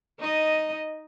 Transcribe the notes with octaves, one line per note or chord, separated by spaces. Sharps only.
D#4 D#5